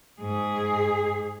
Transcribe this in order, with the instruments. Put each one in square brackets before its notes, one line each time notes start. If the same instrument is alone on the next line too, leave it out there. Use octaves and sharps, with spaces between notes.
[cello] G#2 G#4